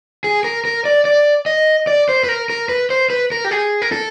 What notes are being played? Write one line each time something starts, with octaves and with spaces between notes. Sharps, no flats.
G#4
A#4
A#4
D5
D5
D#5
D5
C5
B4
A#4
A#4
B4
C5
B4
A#4
G4
G#4
A#4
A4